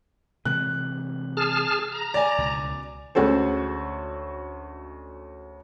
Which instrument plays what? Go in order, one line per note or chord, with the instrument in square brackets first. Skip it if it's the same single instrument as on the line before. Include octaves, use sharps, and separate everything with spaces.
[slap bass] C3 E3 G#3 [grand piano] F#6
[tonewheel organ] G#4 A5 F6
A#5
[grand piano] D5 G#5
[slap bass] C#2 B2
[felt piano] D2 G#3 C#4 F#4 A4 C5